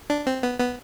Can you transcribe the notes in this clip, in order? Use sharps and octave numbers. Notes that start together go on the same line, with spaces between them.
D4
C4
B3
B3